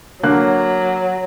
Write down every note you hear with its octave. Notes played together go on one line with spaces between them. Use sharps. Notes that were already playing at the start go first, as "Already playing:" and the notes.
D3 F#3 A#3 F#6